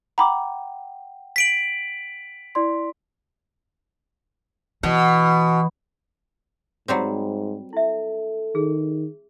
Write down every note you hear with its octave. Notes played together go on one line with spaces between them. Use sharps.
F#5 G5 A#5 B5 D6
B6 D7 F#7
E4 D5 C6
B2 E3
G#2 F#3 G3 C4
E4 A4 E5
D#3 G#4